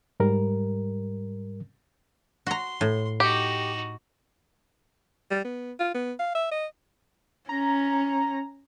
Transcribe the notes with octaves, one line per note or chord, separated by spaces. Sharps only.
G#2 G3 A#4
F#4 A#5 C6
A2
D#4 F#4 G4
G3
B3
F4
B3
F5
E5
D#5
C#4 A#5